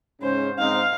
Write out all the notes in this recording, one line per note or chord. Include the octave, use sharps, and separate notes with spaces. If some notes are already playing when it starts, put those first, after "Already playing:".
G#2 C#3 C#4 C5
G#2 C4 D#4 F5